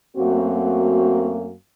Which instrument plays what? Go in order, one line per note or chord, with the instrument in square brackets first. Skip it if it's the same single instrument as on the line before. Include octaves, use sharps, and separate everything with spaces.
[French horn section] F#2 A3 A#3 C4 F#4